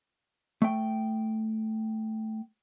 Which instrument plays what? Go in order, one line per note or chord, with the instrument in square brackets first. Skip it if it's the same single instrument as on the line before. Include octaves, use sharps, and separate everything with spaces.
[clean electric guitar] A3 G5